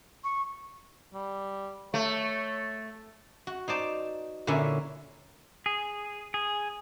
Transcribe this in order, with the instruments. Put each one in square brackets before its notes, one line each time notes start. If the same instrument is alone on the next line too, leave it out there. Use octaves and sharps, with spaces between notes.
[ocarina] C#6
[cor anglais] G3
[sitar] A3 [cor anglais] C#5
[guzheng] F#4
D#4 C5 D5 A5
A#2 D3 A#3 C#4 E4
[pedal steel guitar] G#4
G#4